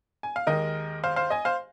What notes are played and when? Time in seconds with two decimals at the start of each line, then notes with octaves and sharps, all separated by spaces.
0.23 G#5
0.36 F5
0.47 D#2 D#3 G#3 A#4 D#5
1.03 C5 F5
1.16 C5 F5
1.30 D#5 G#5
1.45 C5 F5